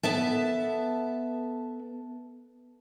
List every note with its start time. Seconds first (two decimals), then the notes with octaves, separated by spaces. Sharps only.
0.03 B3 A4 E5 A5